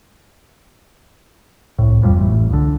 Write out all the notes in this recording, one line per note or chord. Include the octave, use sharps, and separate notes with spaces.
C2 A2
D#1 F2 A#2 G3
A1 A2
C#2 D3